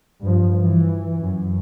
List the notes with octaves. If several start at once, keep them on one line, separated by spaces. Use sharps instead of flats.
G2 F3
E3
F#2